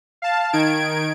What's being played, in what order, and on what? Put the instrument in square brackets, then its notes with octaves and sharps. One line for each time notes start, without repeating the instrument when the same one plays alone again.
[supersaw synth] F5 A5
D#3 G#6 D7